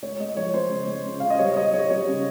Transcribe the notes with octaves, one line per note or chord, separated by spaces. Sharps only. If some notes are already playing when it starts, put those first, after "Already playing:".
G#3 C#5
G#3 D#5
F3 C#5
G#3 C5
C#3
G#3
C#3
C#3 F5
D#5
G3 C#5
G3 D#5
G3 C#5
G3 C#5
C#3